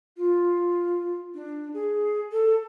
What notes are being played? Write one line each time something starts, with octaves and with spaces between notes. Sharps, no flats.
F4
D4
G#4
A4